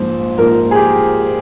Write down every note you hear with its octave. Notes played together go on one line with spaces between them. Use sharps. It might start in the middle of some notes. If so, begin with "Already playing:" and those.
Already playing: A#1 G#2 F3 C5
A#1 G#2 F3 A#4
G#4
G4